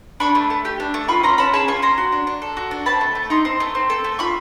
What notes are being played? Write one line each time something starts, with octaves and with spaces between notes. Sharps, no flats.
D4 B5 C#6
A3
A3
G4
D4
A3
F4 B5 C#6
C#4 A#5 C6
C#4 A5 B5
G#4 A5 B5
F4 B5 C#6
C#4 A#5 C6
F#4
D4
D4
A4
F#4
D4
C4 A5 B5
A3
A3
D#4 A#5 C6
C4
A3
C4
A4
A3
F4 B5 C#6